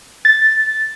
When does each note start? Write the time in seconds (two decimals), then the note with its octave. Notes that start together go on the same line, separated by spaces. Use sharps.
0.25 A6